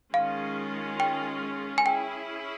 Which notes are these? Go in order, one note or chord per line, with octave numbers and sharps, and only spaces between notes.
D#3 G#3 C#4 F4 G#4 F5
G5
G#5
C#4 E4 G#4 G5